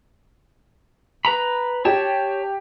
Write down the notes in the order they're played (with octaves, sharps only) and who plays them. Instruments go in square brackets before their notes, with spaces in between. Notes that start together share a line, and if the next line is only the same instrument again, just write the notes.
[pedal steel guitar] B4 A#5 B5
[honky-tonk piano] G4 [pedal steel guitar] C#5 A5